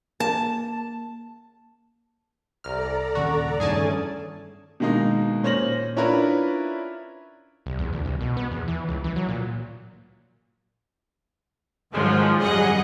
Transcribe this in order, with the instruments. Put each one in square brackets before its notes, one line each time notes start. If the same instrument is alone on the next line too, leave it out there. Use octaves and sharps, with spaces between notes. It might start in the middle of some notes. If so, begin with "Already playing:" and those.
[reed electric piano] A#3 [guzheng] A5
[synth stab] C2 F6 [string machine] A4 D5 [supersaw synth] A#5
[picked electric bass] D#1 D#2 C#3 [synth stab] F#4
[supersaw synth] E2 A3 C#4 [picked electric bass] G2 D#3 [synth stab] G#4 G#5 A5
[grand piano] B2 D#3 G#3 A#3 D#4
A#2 C#4 C5 F6 A#6 F#7
C#4 D4 E4 F4 A#4 B4
[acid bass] C2
E2
D2
C2
B2
B3
E2
E3
C#2
E3
F#3
A#2
[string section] G#2 D#3 F3 F#3 G#3
G#1 F#2 G3 G#4 D#5 F#5